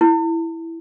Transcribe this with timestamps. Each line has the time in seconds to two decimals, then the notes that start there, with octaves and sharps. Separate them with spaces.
0.01 E4